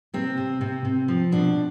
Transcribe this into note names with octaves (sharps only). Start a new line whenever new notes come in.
C3 C4
C3
C3
C3
F3
B2 D4